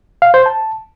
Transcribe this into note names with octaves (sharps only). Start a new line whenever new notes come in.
F5
C5
A5